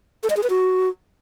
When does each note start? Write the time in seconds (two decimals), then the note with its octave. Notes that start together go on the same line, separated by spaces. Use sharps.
0.23 A4
0.30 D#5
0.37 G#4
0.43 B4
0.50 F#4